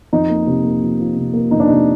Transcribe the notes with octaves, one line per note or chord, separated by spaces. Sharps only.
F2 D#4
A#3
C3
A#3
F3
F3
C3
A#3
F2 D#4
D4
C3 D#4